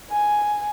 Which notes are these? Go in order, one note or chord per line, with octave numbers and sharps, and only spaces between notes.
G#5